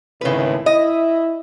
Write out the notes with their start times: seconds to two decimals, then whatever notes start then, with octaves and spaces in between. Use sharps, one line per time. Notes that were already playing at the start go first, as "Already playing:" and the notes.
0.21 G#1 C#2 A2 C#3 B4
0.66 E4 D#5 E5